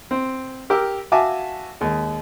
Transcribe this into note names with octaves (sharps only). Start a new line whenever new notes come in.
C4
G4 A#4 D6 E6
F#4 E5 F5 G#5 A5 D6
D#2 G#3